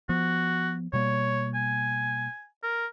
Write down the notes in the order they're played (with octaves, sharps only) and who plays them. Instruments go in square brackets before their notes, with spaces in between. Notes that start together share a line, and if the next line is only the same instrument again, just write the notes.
[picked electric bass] F3 B3 [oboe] F#4
[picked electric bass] B2 G3 A#3 [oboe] C#5
[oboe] G#5
A#4